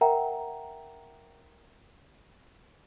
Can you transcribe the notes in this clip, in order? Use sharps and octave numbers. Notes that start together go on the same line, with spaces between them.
A#4 E5 F#5 G5 A#5